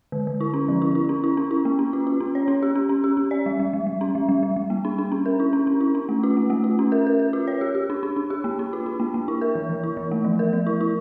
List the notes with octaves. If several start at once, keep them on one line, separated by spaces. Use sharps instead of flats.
D3
D3
E4
C#4
F3
E4
E4
C#4
E4
C#4
E4
A#3
C#4
F4
F4
C#4
C#5
C#4
G4
C#4
C#4
G4
C#4
D5
G3
G3
G3
G3
C#4
G3
G3
G3
G3
A#3
D4
D4
C#4
A#4
E4
C#4
C#4
E4
C#4
A3
F4
A3
A3
F4
C#4
A#4
A#4
A#4
F4
C#5
G4
G4
D4
D4
D4
G4
A#3
D4
F4
D4
A#3
A#3
E4
A#4
E3
E3
E4
E3
A3
F3
A#4
F3
E4
E4